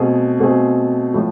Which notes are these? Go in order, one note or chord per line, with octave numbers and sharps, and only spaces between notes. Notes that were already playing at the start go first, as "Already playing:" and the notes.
Already playing: B2 A3 C4 G#4
B2 A3 C4 G#4
A2 F3